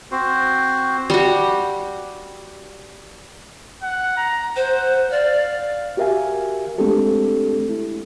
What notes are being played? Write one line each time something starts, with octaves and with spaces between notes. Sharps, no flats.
C4 F#4 C5
G3 F#4
F#5
A#5
C5 F#5
D5 F5
F#4 G4 A#4 E5 F5 G#5
G#3 A3 C4 D4 G4 A4
E4